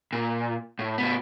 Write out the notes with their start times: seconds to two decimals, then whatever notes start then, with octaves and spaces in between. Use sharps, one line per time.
0.13 A#2
0.79 A2
0.98 A2 B3